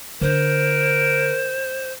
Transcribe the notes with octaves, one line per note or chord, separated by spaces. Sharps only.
D3 A#4 C5